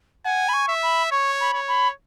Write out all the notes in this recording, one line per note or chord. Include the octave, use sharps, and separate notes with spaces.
F#5 G#5
B5
C#6
E5
B5
C#5 C#6
B5
C#5
B5